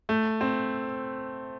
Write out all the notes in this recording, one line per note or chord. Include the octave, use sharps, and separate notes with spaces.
A3
C4